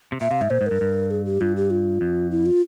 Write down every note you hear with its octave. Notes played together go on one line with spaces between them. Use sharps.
C3
A#2 E5
C3 F5
G#2 E5
A#2 C5
G#2
G2 A#4
G2
G#4
G4
G2 F4
G4
F4
F2
E4
F4